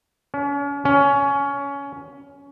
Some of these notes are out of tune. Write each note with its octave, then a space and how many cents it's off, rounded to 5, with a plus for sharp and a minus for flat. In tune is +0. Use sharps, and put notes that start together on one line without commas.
C#4 +40
C#4 +20